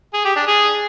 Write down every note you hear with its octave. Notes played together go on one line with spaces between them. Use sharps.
G#4
G4
D4
G#4